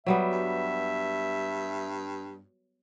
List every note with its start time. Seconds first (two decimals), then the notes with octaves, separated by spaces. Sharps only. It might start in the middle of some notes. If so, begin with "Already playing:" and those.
0.06 F#3 G3 B3 E5
0.32 G2